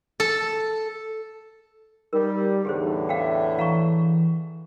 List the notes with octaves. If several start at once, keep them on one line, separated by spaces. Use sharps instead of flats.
A4
G3 D#4 A#4
E2 A2 D3 G4 G#4 C5
E5 F5 G5
E3 F5 A#5 C#6